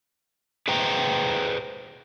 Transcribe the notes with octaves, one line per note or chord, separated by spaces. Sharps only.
G#4 B4 C5 G5 A#5